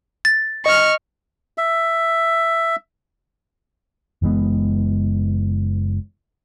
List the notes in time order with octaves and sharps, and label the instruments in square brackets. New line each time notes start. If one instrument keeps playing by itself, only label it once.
[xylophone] A6
[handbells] D#5 [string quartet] C#6 F6
[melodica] E5
[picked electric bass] F#1 E3 G#3 B3